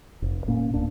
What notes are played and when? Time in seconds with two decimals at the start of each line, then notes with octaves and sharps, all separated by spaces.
0.22 F1
0.48 A#2 A#3 C#4
0.74 D1 A#3 D4